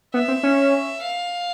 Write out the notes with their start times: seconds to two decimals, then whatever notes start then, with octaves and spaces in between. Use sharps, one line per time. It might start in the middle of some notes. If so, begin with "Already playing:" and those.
0.14 B3 E5
0.28 C4
0.43 C#4
1.02 F5